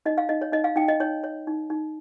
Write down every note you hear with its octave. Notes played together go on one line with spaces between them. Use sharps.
D#4 D#5
F5
D#4 D#5
C#5
D#4 D#5
F5
D#4 G5
D#5
D#4 C#5
C#5
D#4
D#4